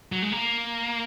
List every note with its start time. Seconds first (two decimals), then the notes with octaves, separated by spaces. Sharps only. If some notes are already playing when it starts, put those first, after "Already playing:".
0.12 F#3
0.22 G#3
0.32 A#3